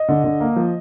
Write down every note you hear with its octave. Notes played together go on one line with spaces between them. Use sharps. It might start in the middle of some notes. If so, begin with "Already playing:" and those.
Already playing: D#5
D3
D3
A#3
F3